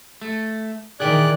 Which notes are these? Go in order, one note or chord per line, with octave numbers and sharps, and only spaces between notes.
A3
A#2 D#3 E3 G#4 D5 G5 F#6